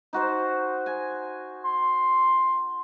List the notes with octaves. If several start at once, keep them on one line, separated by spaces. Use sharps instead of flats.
D#4 F#4 C5
G#5
C6